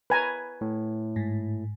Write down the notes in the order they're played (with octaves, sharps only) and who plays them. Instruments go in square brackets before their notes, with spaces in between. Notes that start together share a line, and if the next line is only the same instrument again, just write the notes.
[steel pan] B4 G#5 A#5
[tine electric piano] A2
[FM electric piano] G#2